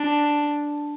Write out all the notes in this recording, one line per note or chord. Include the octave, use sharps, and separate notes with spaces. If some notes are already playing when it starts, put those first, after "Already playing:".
Already playing: D4